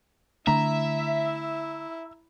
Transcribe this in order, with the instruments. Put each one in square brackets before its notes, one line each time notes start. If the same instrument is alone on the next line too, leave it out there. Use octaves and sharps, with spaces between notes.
[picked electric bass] D3 A3 D4 [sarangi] E4 [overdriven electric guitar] E5 [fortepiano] A#5